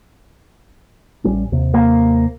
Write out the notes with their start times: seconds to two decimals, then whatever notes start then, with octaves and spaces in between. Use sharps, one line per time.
1.24 A1 G3 C#4
1.52 D#2 C3
1.74 A#3